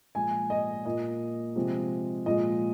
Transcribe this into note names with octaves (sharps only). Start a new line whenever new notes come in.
A#2 F3 G#3 G#5
D#5
A#2 A#3 D#5
C3 F3 G#3
A#2 F3 G#3 D#5